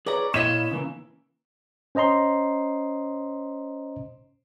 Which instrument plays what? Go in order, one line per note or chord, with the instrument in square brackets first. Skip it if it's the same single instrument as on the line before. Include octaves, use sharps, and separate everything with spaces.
[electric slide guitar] G#4 B4 C#5 [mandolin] D5 A#5
[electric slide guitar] A#2 F5 [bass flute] E4 [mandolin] C#5 D#5 B5 [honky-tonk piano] E7
[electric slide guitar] C#3 E3 A#3
[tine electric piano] C#4 C5 D#5 A#5 C6